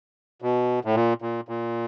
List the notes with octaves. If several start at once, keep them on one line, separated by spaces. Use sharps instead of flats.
B2
A2
A#2
A#2
A#2